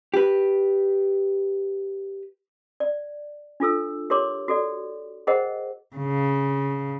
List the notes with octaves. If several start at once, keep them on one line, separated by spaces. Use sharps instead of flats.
G4 B4
D5
D4 F4 A4 E6
G4 A#4 C#5 C6 D6
F#4 A4 D5
G#4 A#4 C5 D#5 F#5 G5
C#3